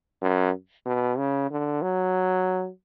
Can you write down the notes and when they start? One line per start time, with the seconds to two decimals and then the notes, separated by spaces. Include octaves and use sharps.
0.21 F#2
0.86 B2
1.18 C#3
1.51 D3
1.82 F#3